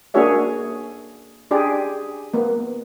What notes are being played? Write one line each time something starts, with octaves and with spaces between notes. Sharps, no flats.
A#3 D4 F#4 G#4 C#5 E5
D4 G4 G#4 D5
A#3 B3